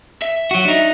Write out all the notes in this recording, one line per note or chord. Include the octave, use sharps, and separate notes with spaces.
E5
F#3 F#4
D4 D#4